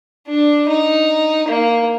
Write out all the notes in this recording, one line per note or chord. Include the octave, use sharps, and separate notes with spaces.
D4
D#4
A#3